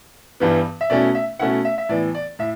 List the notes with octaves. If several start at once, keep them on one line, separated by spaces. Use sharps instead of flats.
G2 E3 G3 B3
E5
B2 A3 C#4 E4 D5
E5
B2 A3 C#4 E4 F#5
E5
E5
A2 E3 B3 D5
D5
A2 E5